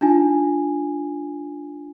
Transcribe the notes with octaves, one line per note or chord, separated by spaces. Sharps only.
D4 D#4 F4 G#5